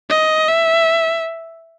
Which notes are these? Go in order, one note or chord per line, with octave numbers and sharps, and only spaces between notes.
D#5
E5